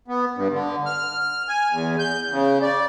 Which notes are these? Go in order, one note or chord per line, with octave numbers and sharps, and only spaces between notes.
B3
G2
D3
F6
G#5
E2
G6
C#3
D5